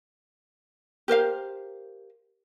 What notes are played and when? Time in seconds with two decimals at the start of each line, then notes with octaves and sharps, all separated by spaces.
1.08 G4 A#4 C5 F5